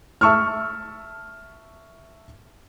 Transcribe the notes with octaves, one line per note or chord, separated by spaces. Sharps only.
E5 A5 C#6 E6 F6